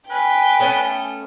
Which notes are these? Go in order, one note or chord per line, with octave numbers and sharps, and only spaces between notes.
B4 G5 G#5
A3 B3 C#4